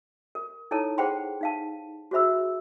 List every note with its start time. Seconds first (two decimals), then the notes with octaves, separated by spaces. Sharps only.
0.35 A#4
0.71 D#4 E4 A4 C#5 A5
0.98 G#4 C5 F#5 G5 B5 C6
1.41 D#4 F5 A5
2.11 F#4 G#4 C5 E5 B5 E6